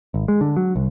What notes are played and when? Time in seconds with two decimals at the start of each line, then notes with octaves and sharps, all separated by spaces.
0.14 G#1
0.28 G#3
0.41 D3
0.57 F#3
0.76 C2